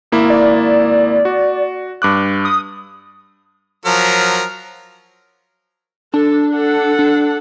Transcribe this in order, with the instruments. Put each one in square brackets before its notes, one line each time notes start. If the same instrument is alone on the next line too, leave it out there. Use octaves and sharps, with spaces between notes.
[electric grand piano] G#1 A#3 E4
[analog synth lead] D5
[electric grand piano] F#4
G2 D6 F#6
[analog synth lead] D#6
[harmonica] F3 F#3 A#4
[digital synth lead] D4 [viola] A4
[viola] A4 F#5
[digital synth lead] D4